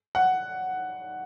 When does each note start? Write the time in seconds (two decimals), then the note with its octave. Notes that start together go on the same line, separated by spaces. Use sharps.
0.15 F#5